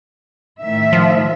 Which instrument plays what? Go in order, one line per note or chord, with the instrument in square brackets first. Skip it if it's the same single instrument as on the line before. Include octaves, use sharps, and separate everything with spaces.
[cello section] A2 D#3 E5
[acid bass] F3